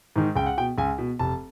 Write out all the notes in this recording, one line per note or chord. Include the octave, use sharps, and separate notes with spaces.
G#2 D#3
C#2 G5
F#5
B2 G5
C#2 G#5
B2
F1 A5